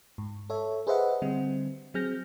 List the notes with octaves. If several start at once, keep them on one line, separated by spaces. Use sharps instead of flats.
G#2
A4 C#5 E5
G#4 B4 C5 D#5 E5 F#5
D3 G3 C4
F#3 C4 G#4 F6 G6 A#6